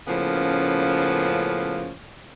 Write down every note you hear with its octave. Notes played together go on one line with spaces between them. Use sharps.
A2 C#3 F3 A#3 B3 C#4